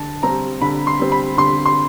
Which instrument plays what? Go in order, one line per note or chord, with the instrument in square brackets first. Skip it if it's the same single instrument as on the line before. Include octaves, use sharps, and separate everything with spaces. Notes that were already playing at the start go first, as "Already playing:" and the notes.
Already playing: [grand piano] D3 A5
G3 C4 A#5
D3 B5
C6
G3 C4
B5
D3 C6
C6